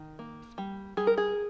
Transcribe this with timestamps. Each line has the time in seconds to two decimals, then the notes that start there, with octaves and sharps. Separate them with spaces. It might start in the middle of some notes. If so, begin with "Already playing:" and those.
Already playing: D#3
0.19 A#3
0.58 G3
0.97 G3 G#4
1.07 A#4
1.18 G#4